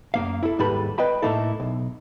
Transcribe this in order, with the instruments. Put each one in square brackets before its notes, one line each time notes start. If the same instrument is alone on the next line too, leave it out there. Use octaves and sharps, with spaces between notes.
[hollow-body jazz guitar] F#2 A#3 F5
E4 A4
D#2 G#2 G3 A4 B4 B5
B4 D#5 G5 B5
A2 A3 A#3 D#4 E4 A4
B1